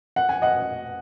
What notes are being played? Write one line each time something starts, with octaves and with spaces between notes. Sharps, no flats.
F#5
G#5
D#5 F#5